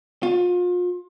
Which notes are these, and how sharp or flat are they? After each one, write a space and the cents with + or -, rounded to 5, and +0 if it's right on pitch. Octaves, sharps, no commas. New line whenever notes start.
F4 +35